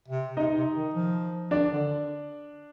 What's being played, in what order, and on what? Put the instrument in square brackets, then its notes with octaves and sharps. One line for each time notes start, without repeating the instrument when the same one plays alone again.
[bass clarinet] C3
[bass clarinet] C3 [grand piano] D#4 D#5
[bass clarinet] C3
D#3
F3
[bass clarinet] D#3 [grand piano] D4 D5
[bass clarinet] D3